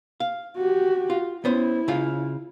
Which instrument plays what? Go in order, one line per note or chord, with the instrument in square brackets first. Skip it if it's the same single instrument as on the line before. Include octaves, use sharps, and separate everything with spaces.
[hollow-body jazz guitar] F5
[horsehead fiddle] F#4 G4
[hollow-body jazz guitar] F4
[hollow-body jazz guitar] B3 C#4 C5 [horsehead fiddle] E4
[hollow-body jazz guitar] C#3 F4 F5